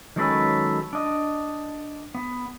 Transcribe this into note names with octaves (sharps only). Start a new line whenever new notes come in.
D#3 F#3 G#3 C#4 A4 B4
D4 D#5
B3